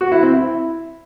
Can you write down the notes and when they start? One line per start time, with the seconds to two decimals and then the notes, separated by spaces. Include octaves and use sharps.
0.01 F#4
0.12 E4
0.23 C4
0.34 E4